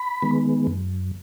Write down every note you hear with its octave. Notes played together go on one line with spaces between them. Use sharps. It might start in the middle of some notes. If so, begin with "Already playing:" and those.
Already playing: B5
D#3 G#3 B3
F#2